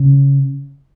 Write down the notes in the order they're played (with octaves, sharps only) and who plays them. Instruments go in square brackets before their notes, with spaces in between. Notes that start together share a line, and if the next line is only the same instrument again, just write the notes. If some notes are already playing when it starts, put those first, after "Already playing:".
Already playing: [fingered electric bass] C#3